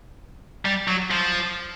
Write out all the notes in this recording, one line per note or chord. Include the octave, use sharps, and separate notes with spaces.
G3
F#3
F3